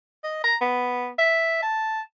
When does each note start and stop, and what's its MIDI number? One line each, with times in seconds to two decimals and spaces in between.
0.24 0.44 75
0.44 0.56 82
0.61 1.10 59
1.19 1.59 76
1.62 2.00 81